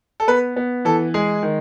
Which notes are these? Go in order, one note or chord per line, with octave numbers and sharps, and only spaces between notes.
A4
B3 B4
B3
E3 A4
G#3 G#4
D#3